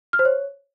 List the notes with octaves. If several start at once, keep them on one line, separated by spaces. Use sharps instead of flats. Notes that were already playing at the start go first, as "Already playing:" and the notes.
F6
C5
C#5